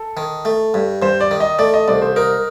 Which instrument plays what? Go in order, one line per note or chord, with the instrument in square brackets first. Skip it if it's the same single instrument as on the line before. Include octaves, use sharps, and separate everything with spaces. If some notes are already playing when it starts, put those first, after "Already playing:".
Already playing: [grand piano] A4
[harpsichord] D#3
A3
G2
[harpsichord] G2 [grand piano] C5
[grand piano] D5
[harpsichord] D#3
[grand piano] D#5
[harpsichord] A3 [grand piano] D5
[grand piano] D#5
[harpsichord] C2 [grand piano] D5
[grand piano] C5
[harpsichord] D#4 [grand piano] A#4